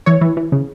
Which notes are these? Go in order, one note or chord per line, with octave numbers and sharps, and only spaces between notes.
E3 C#5
E3
E3
C#3